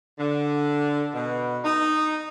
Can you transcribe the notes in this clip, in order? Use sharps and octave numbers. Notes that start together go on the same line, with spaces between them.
D3
B2
D#4